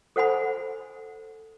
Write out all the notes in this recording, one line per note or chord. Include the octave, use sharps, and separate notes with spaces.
A4 C5 F#5 G#5 B5